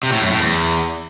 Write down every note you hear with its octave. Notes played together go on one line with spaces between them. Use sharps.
C3
A2
F#2
A2
E2